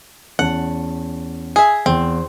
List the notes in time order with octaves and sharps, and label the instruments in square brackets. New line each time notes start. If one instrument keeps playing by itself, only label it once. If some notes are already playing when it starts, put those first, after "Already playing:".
[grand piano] E2 C#4 A5 [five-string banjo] F#5
[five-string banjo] G#4 E5
[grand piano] E2 [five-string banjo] C4